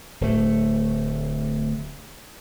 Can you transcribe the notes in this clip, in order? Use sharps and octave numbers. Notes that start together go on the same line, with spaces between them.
D1 A3